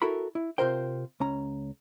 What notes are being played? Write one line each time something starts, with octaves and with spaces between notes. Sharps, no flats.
E4 F#4 A4 A#4 A#5 B5
E4
C3 F#3 F4 A#4 C5 G5
C#2 C#4 A#5